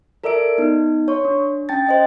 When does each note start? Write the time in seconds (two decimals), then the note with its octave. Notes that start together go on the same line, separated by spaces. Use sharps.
0.24 A4 A#4 D5 E5 E6 D7
0.58 B3 D#4
1.08 C#5 C6 C#6
1.25 D4
1.69 C#4 G5 A5 A6
1.87 C5 D#5 G5